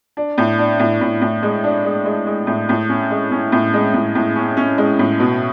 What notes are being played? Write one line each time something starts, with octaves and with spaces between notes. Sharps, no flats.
D4
A2
D4
A2
A2
A2
G#3
D4
G#3
G#3
G#3
A2
A2
C#4
G#3
C#4
A2
G#3
A2
A2
C#4
C#4
G#3
A2
B2